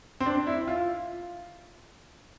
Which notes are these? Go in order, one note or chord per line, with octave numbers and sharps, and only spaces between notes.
C4
D4
E4
F4